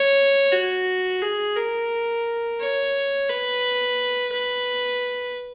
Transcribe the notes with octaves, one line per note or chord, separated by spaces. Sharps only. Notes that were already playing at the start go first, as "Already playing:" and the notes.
Already playing: C#5
F#4
G#4
A#4
C#5
B4
B4